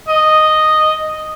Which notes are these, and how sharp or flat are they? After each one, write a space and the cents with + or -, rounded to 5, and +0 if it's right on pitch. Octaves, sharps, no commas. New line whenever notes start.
D#5 -5